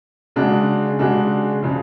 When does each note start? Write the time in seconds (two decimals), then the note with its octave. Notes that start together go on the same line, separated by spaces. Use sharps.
0.36 C#3 G#3 D4 F#4
0.99 C#3 G#3 D4 F#4
1.63 C#3 F3